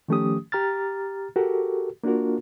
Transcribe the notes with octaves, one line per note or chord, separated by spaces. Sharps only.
D#3 F3 A3 C#4 G4 D#6
G4 A#5 F6 A6
F#4 G4 A4 A#4
A#3 D4 F4 F#4 A#4